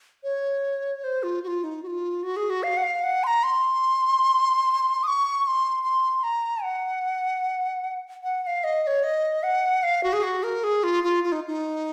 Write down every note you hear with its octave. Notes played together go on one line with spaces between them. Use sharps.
C#5
C5
F4
F#4
F4
D#4
F#4
F4
F#4
G#4
F#4
F5
F#5
F5
F#5
C6
A#5
C6
D#6
C#6
C#6
C6
C6
A#5
F#5
F#5
F#5
F5
D#5
D#5
C#5
D#5
F#5
F5
F#4
G#4
F#4
A#4
G#4
F4
F4
F4
D#4
D#4